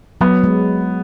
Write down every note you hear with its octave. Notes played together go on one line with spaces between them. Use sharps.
F#3 B3
G#3